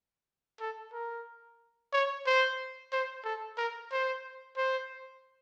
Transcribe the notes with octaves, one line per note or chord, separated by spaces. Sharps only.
A4
A#4
C#5
C5
C5
A4
A#4
C5
C5